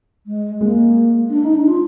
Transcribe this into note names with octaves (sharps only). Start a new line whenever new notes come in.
G#3
G#3 A#3
D4
D#4
D4
F4